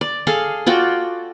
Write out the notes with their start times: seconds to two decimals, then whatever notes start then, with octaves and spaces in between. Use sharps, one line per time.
0.01 D5
0.27 G#4 A4 F5
0.66 F4 F#4 D5 G5